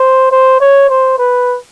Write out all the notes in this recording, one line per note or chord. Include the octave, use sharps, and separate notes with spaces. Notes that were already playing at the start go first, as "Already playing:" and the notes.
Already playing: C5
C5
C#5
C5
B4